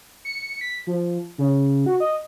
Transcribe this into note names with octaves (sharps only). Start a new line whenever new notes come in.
C#7
B6
F3
C#3
F#4
D#5